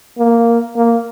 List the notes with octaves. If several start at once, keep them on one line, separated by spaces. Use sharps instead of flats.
A#3
A#3